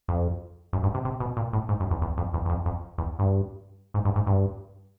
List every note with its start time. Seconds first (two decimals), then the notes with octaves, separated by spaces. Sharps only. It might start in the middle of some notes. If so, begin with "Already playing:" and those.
0.08 F2
0.73 F#2
0.83 G2
0.94 C3
1.05 C3
1.20 B2
1.37 A#2
1.53 A2
1.69 G#2
1.80 F#2
1.91 E2
2.02 E2
2.18 F2
2.33 E2
2.45 E2
2.49 F2
2.66 F2
2.98 E2
3.19 G2
3.94 G#2
4.05 G2
4.16 G#2
4.27 G2